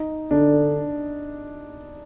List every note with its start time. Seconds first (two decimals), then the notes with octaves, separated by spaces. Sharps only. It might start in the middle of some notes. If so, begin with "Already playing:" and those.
Already playing: D#4
0.31 D3 D4